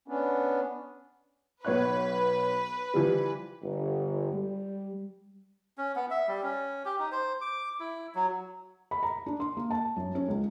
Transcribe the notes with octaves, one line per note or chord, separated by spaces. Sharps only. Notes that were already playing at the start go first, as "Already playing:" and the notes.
B3 C#4 D4
B1 B4 C#5 F#6
E3 F3 G3
G1
G3
C#4
B3
E5
G3
C#4
G4
D#4
C5
D6
E4
F#3
B5
A#5
D4
C6
A#3
A5
F#2
C#4
C#2